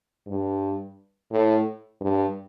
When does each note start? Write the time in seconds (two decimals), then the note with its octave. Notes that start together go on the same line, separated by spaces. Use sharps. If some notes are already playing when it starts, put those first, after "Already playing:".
0.27 G2
1.31 A2
2.01 G2